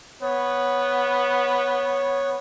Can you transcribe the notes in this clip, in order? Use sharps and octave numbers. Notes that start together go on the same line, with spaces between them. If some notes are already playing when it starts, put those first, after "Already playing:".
B3 C#5